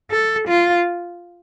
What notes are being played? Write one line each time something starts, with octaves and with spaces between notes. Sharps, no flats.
A4
F4